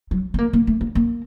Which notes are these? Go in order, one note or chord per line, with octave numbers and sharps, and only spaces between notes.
F#3
B3
A#3
A#3
A3
A#3
A#3